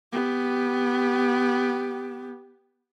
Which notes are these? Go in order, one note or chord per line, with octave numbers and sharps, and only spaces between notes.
B3 G4